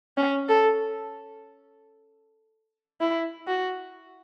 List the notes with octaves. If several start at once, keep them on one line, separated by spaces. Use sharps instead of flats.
C#4
A4
E4
F#4